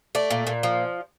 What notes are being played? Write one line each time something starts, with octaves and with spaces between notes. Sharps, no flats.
A3 D5
A#2
A#2
F3